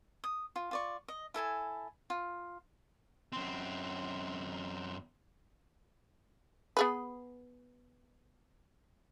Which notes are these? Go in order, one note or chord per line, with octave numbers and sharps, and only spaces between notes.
D#6
F4
F4 D5 C#6
D#5
E4 A4 G#5 A5
F4
F#2 C4
B3 G#4 B4